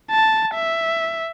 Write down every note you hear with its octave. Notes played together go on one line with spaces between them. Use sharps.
A5
E5